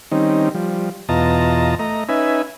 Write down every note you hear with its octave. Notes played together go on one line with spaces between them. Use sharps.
D#3 G3 C4 C#4 D#4
F3 G3
E2 B2 F4 D#5 A5 A#5
A3 D#5 A#5
C#4 D#4 B4 E5 G#5